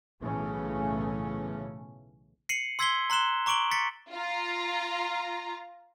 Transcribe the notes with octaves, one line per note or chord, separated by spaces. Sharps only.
B1 A2 C#3 E3 A3 C#4
C7 C#7 D#7 F#7
C6 E6 G#6 B6 C7 G7
A#5 C6 F#6 E7 G7
A#5 C#6 D6 D7 F#7 G7
A6 B6 C#7
F4 A#5